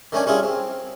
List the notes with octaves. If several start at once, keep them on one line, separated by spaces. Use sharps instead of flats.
D#3 A3 C#4 D4 G#5
G3 C#4 E4 F4 G#4
C4